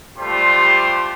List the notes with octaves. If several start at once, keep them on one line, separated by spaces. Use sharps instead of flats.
G3 A3 F4 G4 C5 C6